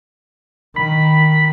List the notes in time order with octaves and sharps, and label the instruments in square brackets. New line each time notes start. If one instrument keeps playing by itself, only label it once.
[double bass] D#3 [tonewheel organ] B5